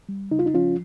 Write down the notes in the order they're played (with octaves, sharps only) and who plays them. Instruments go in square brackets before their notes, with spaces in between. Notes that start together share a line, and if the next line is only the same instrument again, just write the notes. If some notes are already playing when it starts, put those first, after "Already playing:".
[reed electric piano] G3
C#3 D#4
F4
D#4
F3 C#4 F4